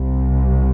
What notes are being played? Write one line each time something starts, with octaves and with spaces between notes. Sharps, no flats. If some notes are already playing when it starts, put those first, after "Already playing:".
Already playing: C2 C3